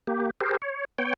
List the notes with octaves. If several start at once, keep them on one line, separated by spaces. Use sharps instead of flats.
A#3 G4
G4 G#4 A#4 C5
C#5
B3 C#5 G5